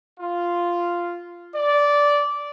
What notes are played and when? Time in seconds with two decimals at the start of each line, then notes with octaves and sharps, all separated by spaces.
0.20 F4
1.56 D5